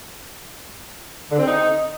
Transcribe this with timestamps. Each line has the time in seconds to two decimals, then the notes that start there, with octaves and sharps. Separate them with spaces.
1.31 D3
1.39 C4
1.47 D#4